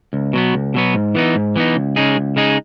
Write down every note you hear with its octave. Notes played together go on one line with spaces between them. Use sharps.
C#2
B2 F#3 B3
C#2
B2 F#3 B3
G#2
E3 B3 D#4
G#2
E3 B3 D#4
C#2
C#3 G#3 D#4 G#4
C#2
C#3 G#3 D#4 G#4